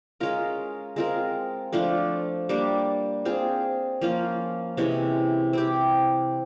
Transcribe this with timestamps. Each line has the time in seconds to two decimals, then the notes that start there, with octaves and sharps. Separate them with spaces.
0.20 G#3 C#4 F4 A#4
0.96 G#3 C4 F4 A#4
1.73 F3 A3 D4 F4
2.49 G3 A#3 D4
3.25 C4 F4 G#4 C5
4.01 F3 A#3 C#4 F4
4.77 C3 E3 G#3 C#4
5.53 C4 E4 G4